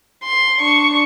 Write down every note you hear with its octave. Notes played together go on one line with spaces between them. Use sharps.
C6
D4 C#6